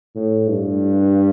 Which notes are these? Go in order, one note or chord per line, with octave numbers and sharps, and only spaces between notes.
A2
G2